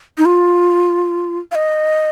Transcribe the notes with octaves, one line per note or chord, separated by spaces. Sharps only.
D#4
F4
F5
D#5